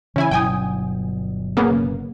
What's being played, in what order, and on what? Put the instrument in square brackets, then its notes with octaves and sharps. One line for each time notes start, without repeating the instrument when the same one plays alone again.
[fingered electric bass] C#3 E3 [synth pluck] C#4 E4 G#5
[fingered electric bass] G1 B2 F#3 [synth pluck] G5 G#5 D#6
[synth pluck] C#3 A#3 B3